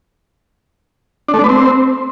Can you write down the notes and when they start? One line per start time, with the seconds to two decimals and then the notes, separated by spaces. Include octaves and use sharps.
1.28 D4
1.34 A3
1.39 D4
1.44 B4
1.49 C4